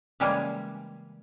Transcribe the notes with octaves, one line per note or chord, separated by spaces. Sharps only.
C#3 E3 G3 G#3 A#3 G#4